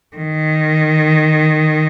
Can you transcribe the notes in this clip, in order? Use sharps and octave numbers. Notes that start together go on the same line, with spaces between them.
D#3